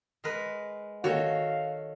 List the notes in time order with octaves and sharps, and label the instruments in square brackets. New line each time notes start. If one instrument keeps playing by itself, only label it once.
[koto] G#3 A#4 B4
[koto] D#3 A4 C#5 [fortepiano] F#4 [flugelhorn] F5